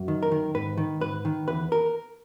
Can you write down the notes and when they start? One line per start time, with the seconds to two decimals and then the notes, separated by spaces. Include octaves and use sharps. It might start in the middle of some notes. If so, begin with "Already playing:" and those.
Already playing: F#2
0.08 D#3
0.23 A#4
0.32 D#3
0.55 G#2 B4
0.78 D#3
1.01 G#2 B4
1.25 D#3
1.48 E2 B4
1.72 A#4